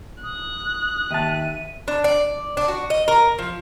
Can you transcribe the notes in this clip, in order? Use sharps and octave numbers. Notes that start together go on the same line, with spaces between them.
D#6 F#6
D#2 E5 A5 D#7
D4
D5
D4
F#4
D#5
A#4
F3